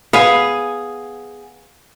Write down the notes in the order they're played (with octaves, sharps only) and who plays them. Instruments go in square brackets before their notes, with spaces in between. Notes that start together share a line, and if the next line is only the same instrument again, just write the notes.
[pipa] B3 G#4 [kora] F5